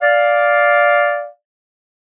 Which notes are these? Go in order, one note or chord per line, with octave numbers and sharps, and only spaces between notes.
D5 F5